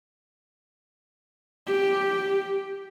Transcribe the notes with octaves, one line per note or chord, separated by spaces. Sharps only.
G4